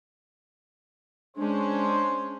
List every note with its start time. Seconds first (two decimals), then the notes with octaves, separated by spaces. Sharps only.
1.37 G#3 C#4 D4 C5